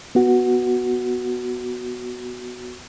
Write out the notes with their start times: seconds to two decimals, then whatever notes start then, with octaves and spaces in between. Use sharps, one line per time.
0.15 B3 F#4